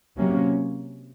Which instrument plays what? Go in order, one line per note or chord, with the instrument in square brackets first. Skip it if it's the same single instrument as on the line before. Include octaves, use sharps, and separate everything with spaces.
[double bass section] C3 F#3 A#3 C#4